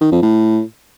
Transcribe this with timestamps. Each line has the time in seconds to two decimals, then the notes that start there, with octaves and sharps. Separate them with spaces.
0.01 D#3
0.12 F2
0.22 A2